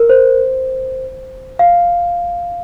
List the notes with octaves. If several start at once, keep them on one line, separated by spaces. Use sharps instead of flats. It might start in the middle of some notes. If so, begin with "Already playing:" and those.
Already playing: A#4
C5
F5